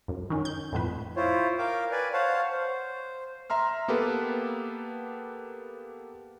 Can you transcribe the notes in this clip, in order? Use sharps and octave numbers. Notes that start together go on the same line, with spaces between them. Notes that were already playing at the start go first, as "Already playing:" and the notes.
F#2
D#3 C#4
G6
F2 A2 F3 B4
E4 F4 C5 C#5
A#4 F5 G5 D6
B4 D5 G#5
C5 C#5 F5 F#5 A5
C5
E5 A#5 C6 F6
A#3 B3 G4 A4 B4